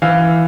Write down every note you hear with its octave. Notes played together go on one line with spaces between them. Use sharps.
E3 F5